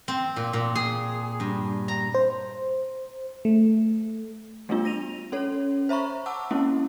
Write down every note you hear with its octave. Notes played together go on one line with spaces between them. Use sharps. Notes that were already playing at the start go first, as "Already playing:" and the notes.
C4
A#2
A#2
G#4
G2
A#5
C5
A3
G3 A3 B3 D4 F4
A#6 D#7 F7
C#4 A4 C#5
C5 E5 A#5 B5 C#6
F#5 A5 D6 E6
G#3 A#3 C4 C#4 E4